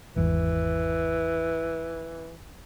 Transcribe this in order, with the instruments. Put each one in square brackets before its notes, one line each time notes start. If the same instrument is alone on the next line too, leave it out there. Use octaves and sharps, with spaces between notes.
[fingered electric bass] G#1 E2 [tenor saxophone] E3